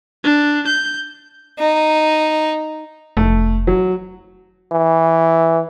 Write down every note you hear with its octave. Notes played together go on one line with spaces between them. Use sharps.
D4
G6
D#4
F1 A3
F#3
E3